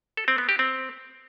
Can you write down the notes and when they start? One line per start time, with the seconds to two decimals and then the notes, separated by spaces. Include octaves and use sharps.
0.17 A4
0.28 C4
0.38 B3
0.49 G4
0.59 C4